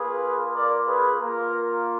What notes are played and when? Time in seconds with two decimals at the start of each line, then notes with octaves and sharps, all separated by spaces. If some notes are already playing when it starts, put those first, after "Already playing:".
Already playing: A#3 F4 G#4 B4
0.54 A#4 D5
0.87 G#4 B4
1.20 A#3 F4 A#4